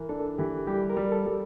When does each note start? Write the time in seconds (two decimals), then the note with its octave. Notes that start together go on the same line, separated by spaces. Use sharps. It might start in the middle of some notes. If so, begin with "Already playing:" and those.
Already playing: E3 A#4
0.09 D4 A4
0.38 E3 G4
0.67 G3 G4
0.90 A#4
0.97 G3
1.12 A4
1.26 G3